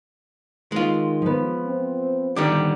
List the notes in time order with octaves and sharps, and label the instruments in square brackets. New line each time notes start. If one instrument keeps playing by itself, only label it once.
[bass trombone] D#3 [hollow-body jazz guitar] G#3 F4
[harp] F3 B3
[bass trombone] C4
[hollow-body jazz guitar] D3 D#3 G3 [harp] D6